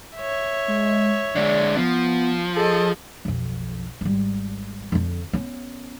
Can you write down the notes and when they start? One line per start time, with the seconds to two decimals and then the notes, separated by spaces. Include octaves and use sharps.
0.17 C#5 E5
0.68 G#3
1.35 D3 G#3 D5
1.77 F3 B3
2.56 G#4 A4 D#5
3.25 B1 F2
4.01 G#1 G3
4.92 F2 D3
5.33 B3 C#4